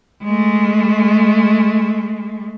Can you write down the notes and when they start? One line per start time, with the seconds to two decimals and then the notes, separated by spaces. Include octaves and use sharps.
0.24 G#3 A3